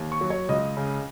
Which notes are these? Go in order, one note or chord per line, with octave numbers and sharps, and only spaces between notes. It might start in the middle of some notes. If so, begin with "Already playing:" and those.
Already playing: D#2
C#6
F#3
C#5
C#2 D#5
C#3